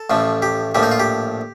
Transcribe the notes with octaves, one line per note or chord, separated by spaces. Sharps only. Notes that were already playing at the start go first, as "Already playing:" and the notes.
Already playing: A4
A1 A2 F3
G4
A#1 A2 F3 G4
D#4
F4
G4